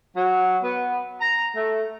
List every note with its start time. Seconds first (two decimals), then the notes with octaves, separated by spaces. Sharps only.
0.16 F#3
0.63 B3
1.20 A#5
1.55 A3